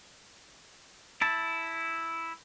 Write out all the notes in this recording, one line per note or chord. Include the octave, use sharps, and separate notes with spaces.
E4 A5